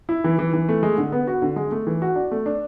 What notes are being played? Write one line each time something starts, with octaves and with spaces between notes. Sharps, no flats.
E4
E3
E3
E3
A3
G#3
D3
B3
F#4
D3
G#3
A3
E3
F#4
D4
A3
D4